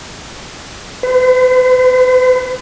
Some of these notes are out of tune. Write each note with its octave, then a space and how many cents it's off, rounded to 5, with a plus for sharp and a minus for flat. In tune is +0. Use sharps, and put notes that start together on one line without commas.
B4 +45